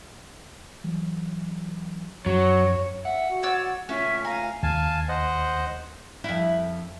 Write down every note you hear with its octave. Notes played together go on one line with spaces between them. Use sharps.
E3 F#3
F#2 F#3 C#5
E5 F#5
F#4
C#5 D5 E6
A3 C#4 F4 C#5 E5 G#5
F5 G#5 A#5
D#2 F5 G#5 A5
C5 D#5 F#5
F2 E4